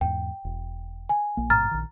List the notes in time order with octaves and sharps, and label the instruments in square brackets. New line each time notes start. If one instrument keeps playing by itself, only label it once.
[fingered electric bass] E2 G#2 [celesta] G5
[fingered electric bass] E1
[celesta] G#5
[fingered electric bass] A#1 A#3
[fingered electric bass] A1 G#2 B2 [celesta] A#5 F6 A6
[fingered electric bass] A#1 D#3